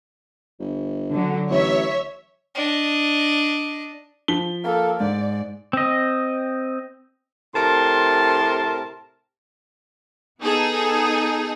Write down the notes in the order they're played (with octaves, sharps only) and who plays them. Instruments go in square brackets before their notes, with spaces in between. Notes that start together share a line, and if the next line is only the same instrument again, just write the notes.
[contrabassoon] G1
[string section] D3 F#3
[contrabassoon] A1 [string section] C#5 E5
[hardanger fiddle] D4 D#5
[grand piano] F3 B6 G7
[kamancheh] A#3 A4
[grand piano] G#2 [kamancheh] D5
[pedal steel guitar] C4 D#5
[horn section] A2 C3 A#4 A5 C6
[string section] B3 D#4 G#4 A4